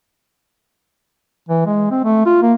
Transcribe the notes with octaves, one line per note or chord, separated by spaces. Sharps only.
E3
G#3
C4
A3
F4
A#3